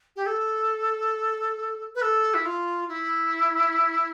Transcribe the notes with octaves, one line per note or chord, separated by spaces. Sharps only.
G4
A4
B4
A4
E4
F4
E4